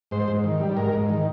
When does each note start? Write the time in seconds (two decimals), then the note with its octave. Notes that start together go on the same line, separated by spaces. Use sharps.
0.11 G#2 C5
0.28 G#2
0.44 D#3
0.60 G3
0.77 G#2 A#4
0.93 G#2
1.09 D#3